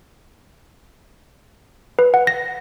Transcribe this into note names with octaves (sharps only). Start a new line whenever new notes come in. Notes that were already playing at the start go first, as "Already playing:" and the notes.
B4
F#5
A#6